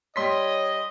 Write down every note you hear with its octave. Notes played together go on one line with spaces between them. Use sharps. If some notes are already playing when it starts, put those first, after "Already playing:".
G3 C#5 D#5 C6 B6